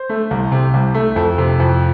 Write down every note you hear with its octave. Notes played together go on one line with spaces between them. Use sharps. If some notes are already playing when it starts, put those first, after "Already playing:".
Already playing: C5
A3
C2
C3
C2
A3
F2 A4
C3
F2